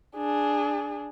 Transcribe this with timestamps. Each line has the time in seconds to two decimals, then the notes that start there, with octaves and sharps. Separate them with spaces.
0.17 D4 G#4